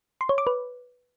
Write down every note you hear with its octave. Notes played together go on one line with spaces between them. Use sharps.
C6
C#5
D6
B4